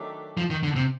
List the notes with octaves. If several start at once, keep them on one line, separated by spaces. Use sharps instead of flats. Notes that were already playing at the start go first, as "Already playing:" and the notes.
Already playing: D#3 F#3 A3 D4 G4
F3
D#3
D3
C3